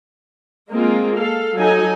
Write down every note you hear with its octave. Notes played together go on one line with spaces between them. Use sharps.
G#3 A#3 C4 F4
A4 F5
F#3 D#4 A4 G#5